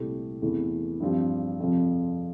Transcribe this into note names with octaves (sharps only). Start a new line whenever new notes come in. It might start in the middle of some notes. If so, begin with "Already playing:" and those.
Already playing: C2 A#2 A3 E4 G4
E2 C3 E3 A3 E4
G2 F3 C4 G4
F2 C3 F3